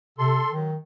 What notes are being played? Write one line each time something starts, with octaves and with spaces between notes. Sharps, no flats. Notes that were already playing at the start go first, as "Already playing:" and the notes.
C3 A4 C6
D#3 F#3